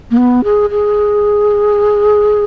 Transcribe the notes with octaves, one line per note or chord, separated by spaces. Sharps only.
A#3
B3
G#4
G#4